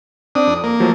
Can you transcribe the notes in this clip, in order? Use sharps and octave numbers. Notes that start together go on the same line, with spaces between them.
C4 D4 D#6
F2
A#3
F3 F#3 A3